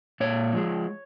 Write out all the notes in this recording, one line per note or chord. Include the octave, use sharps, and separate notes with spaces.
A#2 C#5
F3 G#3